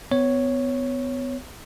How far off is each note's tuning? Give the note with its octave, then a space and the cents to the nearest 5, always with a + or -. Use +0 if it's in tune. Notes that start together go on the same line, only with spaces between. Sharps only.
B3 +30 C#5 +0